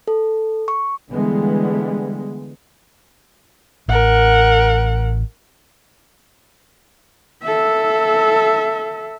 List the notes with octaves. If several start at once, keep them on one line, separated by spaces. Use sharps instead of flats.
A4
C#6
D3 E3 G3 G#3 B3
A1 A#4 F#5
A4 E5